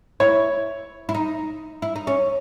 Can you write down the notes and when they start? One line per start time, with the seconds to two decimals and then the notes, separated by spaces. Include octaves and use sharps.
0.20 E4 C#5
1.09 E4
1.14 D#4
1.82 E4
1.96 D#4
2.07 C#4